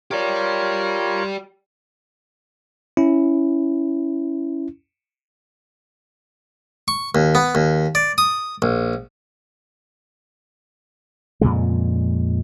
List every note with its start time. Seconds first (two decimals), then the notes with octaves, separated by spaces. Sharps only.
0.11 F4 G4 A#4 C#5 D5
2.97 C#4 E4
6.88 C#6
7.15 D#2
7.35 B3
7.55 D#2
7.95 D5
8.18 D#6
8.62 A#1
11.41 F2 A#2 C#3 G#3